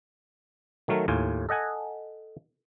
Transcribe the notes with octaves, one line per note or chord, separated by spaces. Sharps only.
D#3 F#3 A3 A#4
D#2 A2 F4 G#5
A4 D#5 F#5 G#5